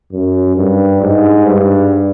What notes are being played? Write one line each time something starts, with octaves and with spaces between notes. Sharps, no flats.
F#2
G2
G#2
G2